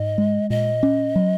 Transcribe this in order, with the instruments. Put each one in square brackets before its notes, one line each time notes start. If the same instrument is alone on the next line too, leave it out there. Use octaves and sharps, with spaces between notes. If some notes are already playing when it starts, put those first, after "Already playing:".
Already playing: [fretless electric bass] G#2 [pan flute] D#5
[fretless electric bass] G#3
[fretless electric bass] A#2 [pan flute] D#5
[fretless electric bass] C#4
F#3